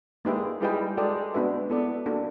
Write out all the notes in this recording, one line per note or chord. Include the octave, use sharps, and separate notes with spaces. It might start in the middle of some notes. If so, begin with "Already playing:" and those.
G#3 A#3 D#4 G4 B4 E5
G3 E4 G#4 B4 D#5 G5
G#3 F#4 A4 D5 G5
B3 D4 F#4 B4 E5
B3 E4 A4 D5
A#3 D4 F#4 A4